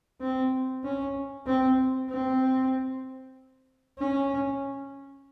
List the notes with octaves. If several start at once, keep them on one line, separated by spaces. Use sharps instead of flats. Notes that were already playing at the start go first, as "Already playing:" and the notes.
C4
C#4
C4
C4
C#4